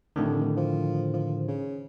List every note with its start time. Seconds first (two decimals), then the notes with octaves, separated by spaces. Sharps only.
0.16 F1 A2 D3 D#3
0.57 F3
1.14 F3
1.47 C#3